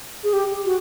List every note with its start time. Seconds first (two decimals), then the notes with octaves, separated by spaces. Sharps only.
0.24 G#4
0.33 G4
0.65 F#4